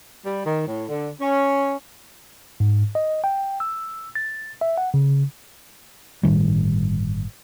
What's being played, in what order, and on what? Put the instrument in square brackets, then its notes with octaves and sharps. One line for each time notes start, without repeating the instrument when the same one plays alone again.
[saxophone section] G3
D#3
A2
D3
C#4
[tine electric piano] G#2
D#5
G5
E6
A6
E5
F#5
C#3
[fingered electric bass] G1 A2 D#3 G3